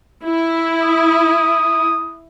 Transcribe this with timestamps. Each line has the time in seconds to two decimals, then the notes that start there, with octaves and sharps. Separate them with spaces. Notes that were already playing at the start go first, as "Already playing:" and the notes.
0.23 E4
0.83 D#6